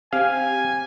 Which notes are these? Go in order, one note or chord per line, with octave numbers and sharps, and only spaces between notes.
C4 G4 F5 G#5